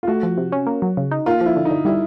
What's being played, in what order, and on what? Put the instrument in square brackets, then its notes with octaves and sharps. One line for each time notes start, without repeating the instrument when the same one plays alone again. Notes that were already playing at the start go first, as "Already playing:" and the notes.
[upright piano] F4
[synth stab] A3 [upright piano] F#4
[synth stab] F3
C3
C#4
A#3
F#3
C#3
D#4
[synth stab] A#3 [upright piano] F4
[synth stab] F3 [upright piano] E4
[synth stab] D3
[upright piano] D#4
[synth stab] D3
[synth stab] G3 [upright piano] E4